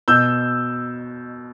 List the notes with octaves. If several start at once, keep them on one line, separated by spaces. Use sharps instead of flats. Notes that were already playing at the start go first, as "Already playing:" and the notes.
B2 E6 G6